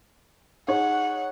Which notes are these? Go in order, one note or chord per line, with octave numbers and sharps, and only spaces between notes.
D#4 G#4 C#5 F#5